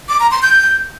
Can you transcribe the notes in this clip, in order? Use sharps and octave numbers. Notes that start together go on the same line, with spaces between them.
D6
A#5
C6
G6